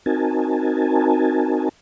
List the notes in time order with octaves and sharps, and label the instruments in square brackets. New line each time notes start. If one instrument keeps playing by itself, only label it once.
[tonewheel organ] C4 D#4 F#4 A#4 G#5 A5